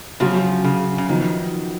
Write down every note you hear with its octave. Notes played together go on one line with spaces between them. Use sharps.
C#3 F3 F#3 C#4 F#4
C#3
C#3
D#3 F3 B3 D#4 F#4